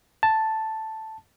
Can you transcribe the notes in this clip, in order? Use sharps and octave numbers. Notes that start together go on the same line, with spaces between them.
A5